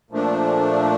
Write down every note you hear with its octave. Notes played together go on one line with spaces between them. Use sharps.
A#2 F3 A3 D4